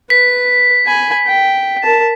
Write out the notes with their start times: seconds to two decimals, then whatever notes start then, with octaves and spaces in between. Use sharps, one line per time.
0.10 B4 B6
0.86 G#5 B5
1.27 G5
1.83 A#4 A5